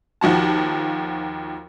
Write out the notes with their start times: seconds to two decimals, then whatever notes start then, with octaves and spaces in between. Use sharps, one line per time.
0.21 D#2 F3 F#4 A5